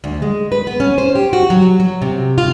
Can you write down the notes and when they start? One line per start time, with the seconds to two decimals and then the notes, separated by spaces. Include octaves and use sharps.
0.04 D2
0.22 G#3
0.52 B4
0.67 B3
0.80 C#4
0.98 C5
1.15 G4
1.33 F#4
1.50 F#3
1.80 F#3
2.02 C3
2.38 F4